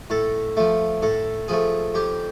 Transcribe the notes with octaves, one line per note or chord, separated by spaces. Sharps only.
A2 A4
F3 A3
A2 A4
F3 A3 G#4
F2 G4